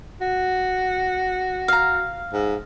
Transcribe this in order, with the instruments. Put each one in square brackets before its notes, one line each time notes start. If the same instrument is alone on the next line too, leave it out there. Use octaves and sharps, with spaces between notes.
[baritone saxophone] F#4
[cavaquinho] F5 A#5
[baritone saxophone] G#2